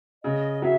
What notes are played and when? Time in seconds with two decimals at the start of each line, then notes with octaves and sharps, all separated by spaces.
0.24 C#3 D#5
0.62 F#3 E5